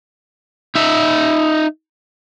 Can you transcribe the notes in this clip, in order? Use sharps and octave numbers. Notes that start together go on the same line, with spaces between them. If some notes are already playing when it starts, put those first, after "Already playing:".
D#4 E5